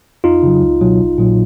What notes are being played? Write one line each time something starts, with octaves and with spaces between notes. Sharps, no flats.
F2 D#4 F4
C#3 F#3
C#2
B2 F#3
A#1
A#2 F#3